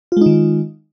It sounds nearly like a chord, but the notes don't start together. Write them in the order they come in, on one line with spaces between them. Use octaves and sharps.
F4 G#3 D#4 D#3